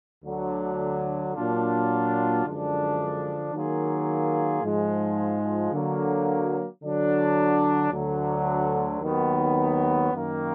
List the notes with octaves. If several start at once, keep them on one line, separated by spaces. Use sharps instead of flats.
D2 D3 F#3
A#2 F#3 D4 F4
F#2 D3 F3 G#3 D4
D#3 F#3 A#3 F4 G#4
G#2 F3 G#3
D3 F#3 A#3
D3 F#3 D4
D2 D3 F#3
D#2 D#3 F#3 B3
F#2 D#3 A#3